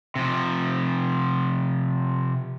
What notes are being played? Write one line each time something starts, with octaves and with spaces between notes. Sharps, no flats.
C3 F3